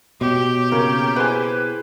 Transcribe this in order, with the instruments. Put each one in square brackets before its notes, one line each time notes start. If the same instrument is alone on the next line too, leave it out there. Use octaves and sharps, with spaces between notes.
[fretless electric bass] B2 [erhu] G4 [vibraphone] C#5
[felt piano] C#3 C#4 A#4 [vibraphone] A#3 A#5
[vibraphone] E4 G#4 [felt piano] B4 C5 G#5